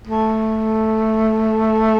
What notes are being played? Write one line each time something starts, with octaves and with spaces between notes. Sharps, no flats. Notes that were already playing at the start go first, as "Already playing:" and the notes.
A3